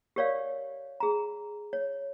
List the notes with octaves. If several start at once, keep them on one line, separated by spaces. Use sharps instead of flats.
G4 A#4 C#5 D5 F5
G#4 A#5
C#5